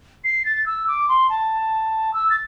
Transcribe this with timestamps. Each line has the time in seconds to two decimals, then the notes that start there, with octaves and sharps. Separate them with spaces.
0.24 C7
0.45 A6
0.66 E6
0.87 D6
1.08 C6
1.29 A5
2.13 E6
2.30 A6